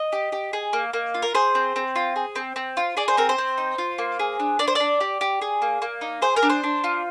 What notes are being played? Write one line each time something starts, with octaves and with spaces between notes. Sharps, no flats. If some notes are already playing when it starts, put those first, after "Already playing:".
Already playing: D#5
G4
G4
G#4
A#3
A#3
F4
A#4
G#4 C5
C4
C4
F4
G#4
C4
C4
F4
G#4 D5
C5
C4 A#4
C5
C4
D#4
F4
A#3
G#4
D4
D4 D5
C5
D4 D5
G4
G4
G#4
A#3
A#3
D#4
G#4 C5
A#4
D4
C5
D4
F4